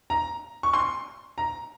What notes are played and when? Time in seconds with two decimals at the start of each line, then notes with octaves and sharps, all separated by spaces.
0.10 A#5
0.63 C#6
0.73 C6
1.38 A#5